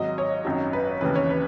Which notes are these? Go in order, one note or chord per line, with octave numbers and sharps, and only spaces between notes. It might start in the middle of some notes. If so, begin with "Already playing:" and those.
Already playing: G#1 G#2 F#3 D#5
C#5
G#1 F#2 D#3 F#3
B4
D#2 C#3 E3 B4
C#5
B4